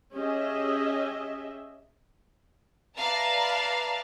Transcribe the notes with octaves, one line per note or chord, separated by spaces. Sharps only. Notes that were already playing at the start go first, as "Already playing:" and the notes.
C#4 G4 G#4 D#5 E5
B4 D5 E5 F5 A5 A#5